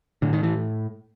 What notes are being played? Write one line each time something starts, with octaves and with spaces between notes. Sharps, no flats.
A2 D3
D#3
E3